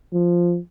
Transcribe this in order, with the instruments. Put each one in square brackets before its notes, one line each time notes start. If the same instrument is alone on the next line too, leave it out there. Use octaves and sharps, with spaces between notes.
[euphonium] F3